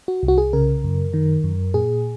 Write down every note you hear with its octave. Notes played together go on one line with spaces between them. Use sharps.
F#4
C2
F#4
G#4
C#3 A#4
F#2
D#3
F#2
A#2 G#4